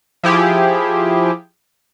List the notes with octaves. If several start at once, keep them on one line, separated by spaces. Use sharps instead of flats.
F3 E4 G4 G#4